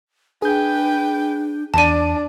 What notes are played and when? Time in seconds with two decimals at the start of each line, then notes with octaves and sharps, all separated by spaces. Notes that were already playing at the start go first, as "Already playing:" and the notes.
0.42 D4 G#4 B4 G5 G6
1.74 E2 D4 D5 A5 D#7